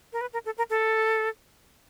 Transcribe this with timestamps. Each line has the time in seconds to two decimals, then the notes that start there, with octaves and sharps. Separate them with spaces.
0.13 A#4
0.21 B4
0.33 A#4
0.46 A4
0.58 A#4
0.70 A4